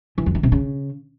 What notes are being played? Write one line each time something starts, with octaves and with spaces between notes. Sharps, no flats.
E3
F2
E3
C3
C#3